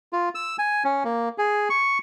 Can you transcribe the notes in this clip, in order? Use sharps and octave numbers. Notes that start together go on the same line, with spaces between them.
F4
E6
G#5
C#4
A#3
G#4
C#6